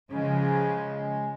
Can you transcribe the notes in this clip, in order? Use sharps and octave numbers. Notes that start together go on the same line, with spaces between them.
C#3 F3 G#3